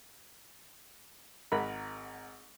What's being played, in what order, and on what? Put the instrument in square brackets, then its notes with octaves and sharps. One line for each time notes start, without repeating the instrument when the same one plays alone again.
[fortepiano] G#1 A#4 F#5 B5